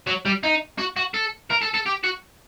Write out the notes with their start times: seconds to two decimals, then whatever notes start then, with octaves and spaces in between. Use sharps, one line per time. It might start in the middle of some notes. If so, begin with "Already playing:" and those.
0.07 F#3
0.26 G3
0.44 D#4
0.78 F#4
0.97 F#4
1.14 A4
1.50 A#4
1.62 A4
1.74 A4
1.86 G4
2.04 F#4